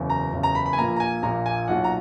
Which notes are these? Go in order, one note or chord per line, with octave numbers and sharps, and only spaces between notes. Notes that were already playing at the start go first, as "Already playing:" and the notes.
Already playing: F#1 E2 C#3
A#5
F#1 E2 C#3
A#5
B5
B5
G#5
A#1 A#2 A#3 A#5
A#5
G#5
A#1 A#2 A#3 A#5
G#5
B1 A#2 F#3 F#5
A#5